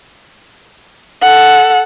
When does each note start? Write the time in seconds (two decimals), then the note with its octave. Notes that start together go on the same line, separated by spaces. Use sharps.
1.22 A4 F#5